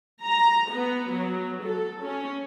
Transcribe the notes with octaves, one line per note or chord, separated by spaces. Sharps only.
A#5
B3
F#3
A4
C#4